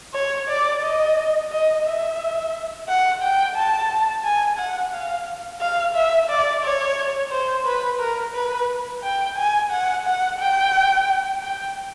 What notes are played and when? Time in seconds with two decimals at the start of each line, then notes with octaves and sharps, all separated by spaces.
0.14 C#5
0.48 D5
0.82 D#5
1.52 D#5
1.86 E5
2.88 F#5
3.22 G5
3.56 A5
4.24 G#5
4.58 F#5
4.93 F5
5.61 F5
5.94 E5
6.29 D5
6.64 C#5
7.31 C5
7.66 B4
7.99 A#4
8.34 B4
9.03 G5
9.36 G#5
9.71 F#5
10.06 F#5
10.39 G5
11.41 G5